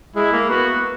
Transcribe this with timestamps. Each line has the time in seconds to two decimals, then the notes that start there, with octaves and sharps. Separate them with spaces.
0.16 G#3 E4
0.33 A#3
0.50 B3 F#4